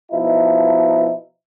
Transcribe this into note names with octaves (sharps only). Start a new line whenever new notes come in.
B2 F3 D#4 E4